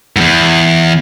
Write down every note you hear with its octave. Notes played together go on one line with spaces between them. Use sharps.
E2 G#2